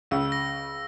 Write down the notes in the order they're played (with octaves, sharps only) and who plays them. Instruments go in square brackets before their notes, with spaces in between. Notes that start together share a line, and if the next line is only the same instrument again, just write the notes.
[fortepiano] C#2 C#3 [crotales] E6
[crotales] A#6